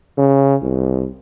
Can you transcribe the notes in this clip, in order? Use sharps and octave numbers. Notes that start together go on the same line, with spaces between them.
C#3
C2